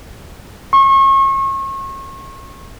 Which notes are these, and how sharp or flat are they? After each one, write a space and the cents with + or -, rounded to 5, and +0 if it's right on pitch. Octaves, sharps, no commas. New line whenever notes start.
C#6 -35